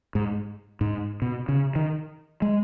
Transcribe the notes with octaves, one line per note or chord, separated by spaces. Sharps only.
G#2
G#2
B2
C#3
D#3
G#3